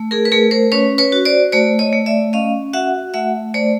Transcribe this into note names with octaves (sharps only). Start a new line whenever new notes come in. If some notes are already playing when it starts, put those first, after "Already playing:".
Already playing: A3
G#4 A#4
B4
A3 G#4 A#4
A#4 C5
C#4 B4 C#5
B4 C#5
F#4
C5 D5
A3 C5 D5
C#5 D#5
A3
D5 E5
C#4 D#5 F5
F#4 E5 F#5
A3 E5 F#5
A3 C5 D5